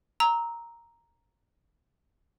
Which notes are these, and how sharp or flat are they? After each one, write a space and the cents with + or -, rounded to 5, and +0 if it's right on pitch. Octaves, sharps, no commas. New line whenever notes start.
A#5 +0 E6 -25